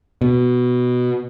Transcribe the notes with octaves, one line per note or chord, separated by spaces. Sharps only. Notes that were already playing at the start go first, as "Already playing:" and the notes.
B2